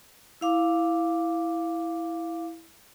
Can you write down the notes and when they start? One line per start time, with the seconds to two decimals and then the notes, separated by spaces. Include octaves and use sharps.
0.41 E4 F5 D6